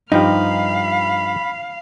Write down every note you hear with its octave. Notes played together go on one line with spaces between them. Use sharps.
G2 F3 D#4 G4 F5 B5